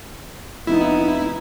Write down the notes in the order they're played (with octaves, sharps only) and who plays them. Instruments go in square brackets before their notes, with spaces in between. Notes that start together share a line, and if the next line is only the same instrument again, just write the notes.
[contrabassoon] F1 [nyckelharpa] B3 D#4 [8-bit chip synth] E4